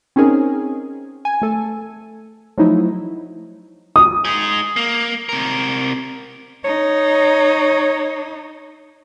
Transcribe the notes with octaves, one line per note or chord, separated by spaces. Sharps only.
C4 C#4 D#4 G#4 A#4
G#5
A3 A4
F3 F#3 A3 D#4 E4
D#6
D#4 G#4
A#3
C3 A#4
D#4 C#5